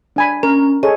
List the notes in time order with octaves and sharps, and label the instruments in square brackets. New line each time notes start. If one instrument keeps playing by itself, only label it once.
[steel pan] D4 G#5 B5
[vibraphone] C#4 [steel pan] A#4
[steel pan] G#4 A4 C#5 [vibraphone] D#5